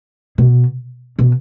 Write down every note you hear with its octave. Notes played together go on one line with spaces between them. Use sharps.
B2
B2